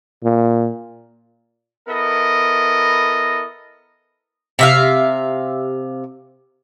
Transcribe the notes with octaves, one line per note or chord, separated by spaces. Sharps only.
A#2
B3 E4 A4 A#4 D#5
C3 E5 F5